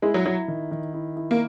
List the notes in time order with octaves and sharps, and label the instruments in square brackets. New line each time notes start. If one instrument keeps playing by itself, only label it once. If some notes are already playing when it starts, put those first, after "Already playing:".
[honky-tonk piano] G#3 [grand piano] E4
[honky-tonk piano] F#3
[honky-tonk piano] F#3 [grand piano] E4
[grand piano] D#3
D#3
E4
E4
[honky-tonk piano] A#3